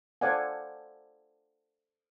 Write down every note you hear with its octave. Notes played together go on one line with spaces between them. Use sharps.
A4 C5 D5 F5 F#5 G#5